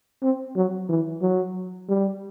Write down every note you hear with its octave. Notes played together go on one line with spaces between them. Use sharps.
C4
F#3
E3
F#3
G3